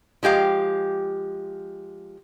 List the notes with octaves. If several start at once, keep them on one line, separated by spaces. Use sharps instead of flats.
F3 G#3 G4 F5